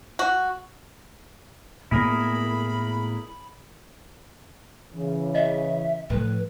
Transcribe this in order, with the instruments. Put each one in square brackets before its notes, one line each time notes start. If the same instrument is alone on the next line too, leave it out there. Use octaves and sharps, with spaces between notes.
[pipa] F#4
[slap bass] A2 A#3 B3 [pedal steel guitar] E4 G#4 A#4 [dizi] B5
[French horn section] C#3 E3
[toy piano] D#5 [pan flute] E5
[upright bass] A2 F3 [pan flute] B4